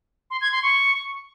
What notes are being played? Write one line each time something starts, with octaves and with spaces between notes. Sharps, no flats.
C6
G#6
C6
C#6